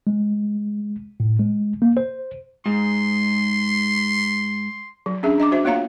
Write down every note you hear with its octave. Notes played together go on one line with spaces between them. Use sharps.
G#3
A2
G#3
A#3
C5
G#2 C6
F#3
C#4 D4 G#4 E5
D4 D#5 A#5 D6
F#4 C5 E5
A#3 B3 F4 C#5 F5 A#5